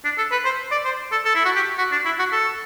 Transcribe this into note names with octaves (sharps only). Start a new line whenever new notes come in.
D4
A4
B4
C5
D5
C5
A4
A4
E4
F#4
G4
F#4
D4
E4
F#4
A4